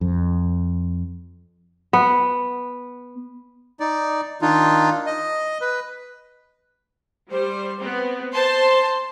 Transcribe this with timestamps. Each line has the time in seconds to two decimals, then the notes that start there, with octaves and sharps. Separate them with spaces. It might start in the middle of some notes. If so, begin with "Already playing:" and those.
0.01 F2
1.93 B3
3.80 D#4 D5
4.42 D#3 D4 D#4 F4
5.06 D#5
5.61 B4
7.30 G3 C5
7.80 B3 C4
8.33 C5 A5 C6